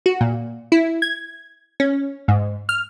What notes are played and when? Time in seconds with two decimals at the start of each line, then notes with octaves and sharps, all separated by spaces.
0.06 F#4
0.21 A#2
0.72 E4
1.02 G#6
1.80 C#4
2.28 G#2
2.69 F6